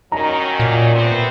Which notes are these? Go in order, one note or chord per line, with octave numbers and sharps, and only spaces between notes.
D#3 F#3 C#4 A#5
A#2
C3 B3 C4